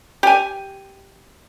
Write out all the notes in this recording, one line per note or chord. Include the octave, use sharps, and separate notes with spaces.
G4 G#5